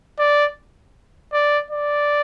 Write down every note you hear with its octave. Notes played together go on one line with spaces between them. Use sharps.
D5
D5
D5